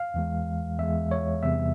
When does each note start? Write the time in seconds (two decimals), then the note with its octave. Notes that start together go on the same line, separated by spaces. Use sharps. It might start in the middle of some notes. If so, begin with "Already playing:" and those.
Already playing: F5
0.14 E2 E3 G#3
0.79 E2 E3 G#3 E5
1.11 C#5
1.43 E2 C3 G3 E5